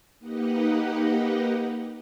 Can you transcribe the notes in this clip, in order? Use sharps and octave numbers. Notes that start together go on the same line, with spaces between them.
A#3 D#4 G4 B4 D#5 F#5